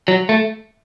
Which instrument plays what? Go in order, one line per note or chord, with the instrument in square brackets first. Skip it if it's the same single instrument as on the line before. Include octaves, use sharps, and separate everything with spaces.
[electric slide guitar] F#3
A3